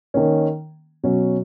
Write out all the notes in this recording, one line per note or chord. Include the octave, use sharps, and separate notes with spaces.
D#3 A#3 C#4
B2 F#3 C#4